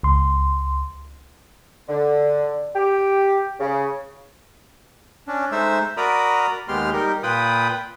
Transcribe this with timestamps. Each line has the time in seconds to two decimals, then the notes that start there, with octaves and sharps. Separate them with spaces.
0.03 C#2 C6
1.88 D3
2.74 G4
3.60 C#3
5.28 C#4 D4
5.52 G#3 A3 D#4 C5 E5 E6
5.97 F#4 A#4 D5 A#5 B5 D#6
6.68 D#2 G#3 B3 G4 C6 F6
6.93 G3 D#4 G4 A#4
7.23 A#2 F4 B4 G5 B5 D#6